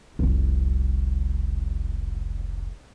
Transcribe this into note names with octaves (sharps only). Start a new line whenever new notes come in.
F1 C2